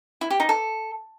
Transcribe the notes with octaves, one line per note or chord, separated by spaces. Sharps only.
E4
G4
D#4
A4